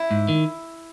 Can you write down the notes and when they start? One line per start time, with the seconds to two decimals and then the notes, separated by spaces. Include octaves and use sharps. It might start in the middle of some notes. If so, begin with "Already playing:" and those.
Already playing: E4
0.11 G#2
0.29 D#3